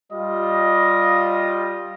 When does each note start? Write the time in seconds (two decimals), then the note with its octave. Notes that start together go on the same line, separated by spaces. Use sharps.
0.12 G3 F4 D#5